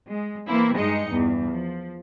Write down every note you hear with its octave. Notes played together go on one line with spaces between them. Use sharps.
G#3
E3 A#3 C4 E4
G2 G#3 D#4 D#5 C#7
E2 G2
F3